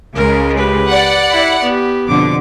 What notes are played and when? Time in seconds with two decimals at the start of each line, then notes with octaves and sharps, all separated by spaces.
0.15 C#2 C#3 G#3 A#4
0.57 G4 B4
0.90 D5 F#5
1.29 E4 B5
1.63 B3 G4
2.08 F2 B2 D3 D6